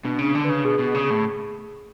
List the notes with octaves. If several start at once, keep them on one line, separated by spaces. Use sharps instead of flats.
B2 D4
C#3
D4
D3
B4
C#3
B2 G#4
B2
G#4
C#3
G#4
A2